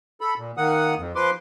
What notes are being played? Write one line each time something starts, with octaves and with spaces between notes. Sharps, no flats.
A4 B5
A#2
D#3 A#3 F#5 D#6
F2
F3 B4 C6 D6